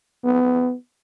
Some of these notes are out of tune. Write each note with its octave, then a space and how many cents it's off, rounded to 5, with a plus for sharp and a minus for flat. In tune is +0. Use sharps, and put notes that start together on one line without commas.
B3 +20